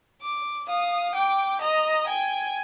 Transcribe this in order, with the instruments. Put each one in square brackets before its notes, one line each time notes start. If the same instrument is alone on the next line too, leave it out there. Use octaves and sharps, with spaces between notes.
[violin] D6
[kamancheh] F5 [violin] D#6
[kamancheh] G5 [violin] D6
[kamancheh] D#5 [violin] A#5
[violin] G5 [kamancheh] G#5